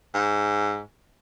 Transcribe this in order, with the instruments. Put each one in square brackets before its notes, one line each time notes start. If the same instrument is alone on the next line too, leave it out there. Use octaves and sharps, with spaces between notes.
[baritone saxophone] G#2